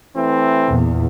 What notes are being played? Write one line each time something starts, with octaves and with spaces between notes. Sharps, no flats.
E3 A3 C4
E2 A#2